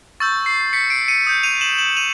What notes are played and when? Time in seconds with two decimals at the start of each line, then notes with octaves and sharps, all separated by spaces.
0.20 C#6 E6 G6 A6
0.46 C7
0.73 B6 C#7
0.90 C7 D7
1.08 C#7 D#7
1.27 D#6 G6
1.43 D#7 F7
1.61 E7 F#7
1.78 E7 F#7
1.97 D#7 F7